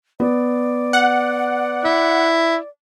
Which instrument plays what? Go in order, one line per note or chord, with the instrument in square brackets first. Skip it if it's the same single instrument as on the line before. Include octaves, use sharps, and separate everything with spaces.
[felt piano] B3 [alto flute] D5
[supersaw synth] F#5
[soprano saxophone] E4